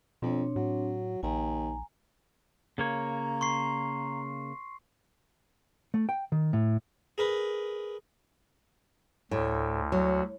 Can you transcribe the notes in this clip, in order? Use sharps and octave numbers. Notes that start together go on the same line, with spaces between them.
F2 B2 C4 D4 C#5
A2 F#3
A#1 D#2 G#5 A#5
C#3 A#3 C#5 A#5
C6 C#6 C7
A3
G5
D#3
A2
G#4 A#4 B4
D2 A2
F#3